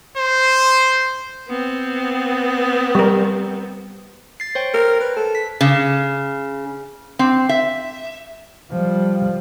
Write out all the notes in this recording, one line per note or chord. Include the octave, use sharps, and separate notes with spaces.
C5
B3 C4
G3 A#4
A6 C7
C5 C#5 G5
A#4
B4
A4
B6
C#3
C4
E5
F3 G3